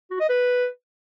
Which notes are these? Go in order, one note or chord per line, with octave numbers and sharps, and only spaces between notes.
F#4
D#5
B4